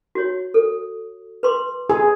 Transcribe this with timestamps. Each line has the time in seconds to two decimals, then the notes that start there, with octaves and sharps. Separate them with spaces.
0.15 F#4 C#5
0.54 A4
1.43 B4 C6 D6
1.90 G#4